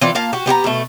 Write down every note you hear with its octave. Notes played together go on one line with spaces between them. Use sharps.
E3 C4 F4 D5
A#3 F4 F5 A5
F#4 G4
B3 G4 G#4 A#5
B2 A3